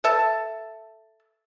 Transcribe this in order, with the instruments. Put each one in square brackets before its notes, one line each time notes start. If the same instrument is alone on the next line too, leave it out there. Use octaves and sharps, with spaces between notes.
[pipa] A4 E5 A5